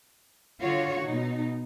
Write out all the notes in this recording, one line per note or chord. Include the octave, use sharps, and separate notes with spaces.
D3 F4 F#4 C#5
B2 D#4